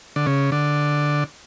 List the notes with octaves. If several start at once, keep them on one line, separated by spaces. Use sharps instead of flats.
D3
C#3
D3